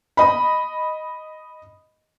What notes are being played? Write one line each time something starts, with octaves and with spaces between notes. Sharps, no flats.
D#5 B5